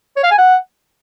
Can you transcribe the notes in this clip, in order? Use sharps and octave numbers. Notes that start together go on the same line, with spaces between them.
C#5
F5
G#5
F#5